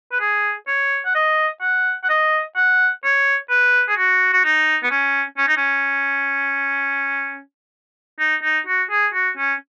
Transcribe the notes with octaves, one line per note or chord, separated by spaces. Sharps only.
B4
G#4
C#5
F#5
D#5
F#5
F#5
D#5
F#5
C#5
B4
G#4
F#4
F#4
D#4
B3
C#4
C#4
D#4
C#4
D#4
D#4
F#4
G#4
F#4
C#4